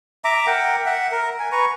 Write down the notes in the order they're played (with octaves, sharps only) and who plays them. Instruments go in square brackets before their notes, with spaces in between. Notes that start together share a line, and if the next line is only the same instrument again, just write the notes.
[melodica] E5 A#5 D6
A#4 F#5 G5
E5 F#5
A#4
G#5
B4 A#5 C#6